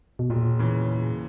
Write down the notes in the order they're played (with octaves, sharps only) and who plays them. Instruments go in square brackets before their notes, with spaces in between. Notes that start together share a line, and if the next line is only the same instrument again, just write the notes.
[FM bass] B2
[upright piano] E1 [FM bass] A#2
[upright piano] C#3 E3